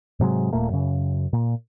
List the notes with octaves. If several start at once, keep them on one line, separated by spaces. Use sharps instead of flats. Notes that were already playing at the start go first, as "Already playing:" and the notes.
G#2 C3 F#3 G#3
D#1 A#2 A3 A#3
F#2 C#3
A#2